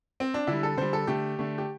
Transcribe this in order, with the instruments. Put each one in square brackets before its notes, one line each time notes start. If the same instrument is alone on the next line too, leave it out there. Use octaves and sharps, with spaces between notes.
[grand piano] C4
D4
D3 G3 E4
A4
D3 G3 C5
A4
D3 A3 G4
D3 A3
G4